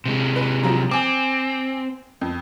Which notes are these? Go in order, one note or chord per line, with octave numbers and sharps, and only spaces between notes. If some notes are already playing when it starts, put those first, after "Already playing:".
C3 G#3
B4
F3 F#3 A#5
C4 G#5 D6
F2